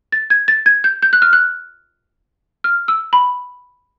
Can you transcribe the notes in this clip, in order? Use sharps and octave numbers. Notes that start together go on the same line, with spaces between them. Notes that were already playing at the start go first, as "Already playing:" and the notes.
A6
G#6
A6
G#6
G6
G6
F#6
F6
F#6
F6
E6
B5